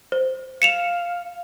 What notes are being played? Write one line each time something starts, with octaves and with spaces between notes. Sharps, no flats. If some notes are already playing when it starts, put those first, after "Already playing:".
C5
F5 C#7 E7 F7